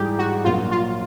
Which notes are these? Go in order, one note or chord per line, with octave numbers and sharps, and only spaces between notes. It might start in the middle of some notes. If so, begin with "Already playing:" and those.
Already playing: G#2 E3 G3 E4 G4 G#4
F#4
A#1 A#2 F#3 A#3 F4
F4